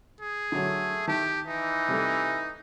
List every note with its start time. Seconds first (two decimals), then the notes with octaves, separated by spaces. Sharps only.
0.21 G#4
0.52 D3 F#3 A3
1.08 D#3 G4 A5
1.48 E3 D#4
1.88 C3 G3 A3